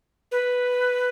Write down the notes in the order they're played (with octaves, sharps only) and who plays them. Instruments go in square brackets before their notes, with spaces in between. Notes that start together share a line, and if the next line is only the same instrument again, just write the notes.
[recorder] B4